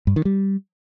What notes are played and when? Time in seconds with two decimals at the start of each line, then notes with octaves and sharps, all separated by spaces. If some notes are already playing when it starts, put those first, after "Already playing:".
0.07 G2
0.16 D#3
0.25 G3